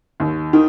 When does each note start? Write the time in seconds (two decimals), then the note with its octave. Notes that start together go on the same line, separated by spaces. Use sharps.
0.20 D#2
0.53 D#3